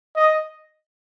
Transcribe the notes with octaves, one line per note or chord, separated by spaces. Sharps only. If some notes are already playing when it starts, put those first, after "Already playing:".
D#5